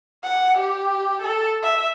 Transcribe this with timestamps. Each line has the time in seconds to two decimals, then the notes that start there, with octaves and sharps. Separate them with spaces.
0.24 F#5
0.58 G4
1.22 A4
1.63 E5